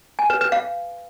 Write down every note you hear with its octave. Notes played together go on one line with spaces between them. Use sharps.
G#5
B4
B4
F5